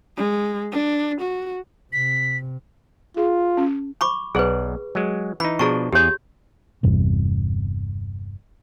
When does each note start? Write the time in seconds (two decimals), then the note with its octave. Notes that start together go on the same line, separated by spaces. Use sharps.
0.17 G#3
0.72 D4
1.21 F#4
1.93 C3 B6
3.17 F4 G#4
3.57 C#4
4.01 B5 C#6 D6
4.35 B1 G#4 B4 D5 F#5
4.95 F#3 G#3
5.40 E3 D#4 B5
5.59 B2 F3 D4 G#4 A#5 C#6
5.92 E2 G4 G#4 C#5
6.83 G1 E2 G2 C3